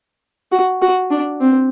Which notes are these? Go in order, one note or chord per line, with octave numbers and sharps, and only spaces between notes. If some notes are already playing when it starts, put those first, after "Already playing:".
F#4
F#4
D4
C4